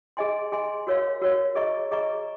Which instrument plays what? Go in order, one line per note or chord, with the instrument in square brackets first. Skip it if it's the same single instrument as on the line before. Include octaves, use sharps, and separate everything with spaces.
[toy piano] G#4 D#5 G#5 C6
G#4 D#5 G#5 C6
F#4 A#4 C#5 F5
F#4 A#4 C#5 F5
G#4 D#5 A#5 C#6
G#4 D#5 A#5 C#6